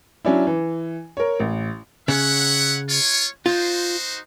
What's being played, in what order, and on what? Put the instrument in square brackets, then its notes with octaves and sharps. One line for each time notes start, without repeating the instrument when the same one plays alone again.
[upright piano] F#3 C#4 D4 E4
E3
A#4 C#5
A1
[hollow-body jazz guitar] C#3 [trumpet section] C#5 E5 F#5
[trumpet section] F4 C#5
[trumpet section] D#4 F#4 C5 [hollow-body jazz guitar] F4